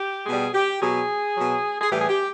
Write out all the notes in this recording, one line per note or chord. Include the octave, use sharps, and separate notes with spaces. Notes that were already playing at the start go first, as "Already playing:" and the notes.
Already playing: G4
B2 G3 G#4
G4
B2 F#3 G#4
B2 F#3
G#4
A2 E3 G3 G4
G#4
G4